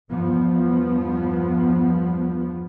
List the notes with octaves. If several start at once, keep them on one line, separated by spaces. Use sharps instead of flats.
E2 G2 F3 B3